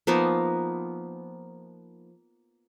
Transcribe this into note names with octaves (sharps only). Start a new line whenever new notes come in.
F3 A#3 B3 D#4